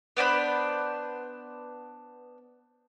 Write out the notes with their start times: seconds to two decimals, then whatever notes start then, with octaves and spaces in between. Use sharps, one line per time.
0.17 B3 D4 C5 B5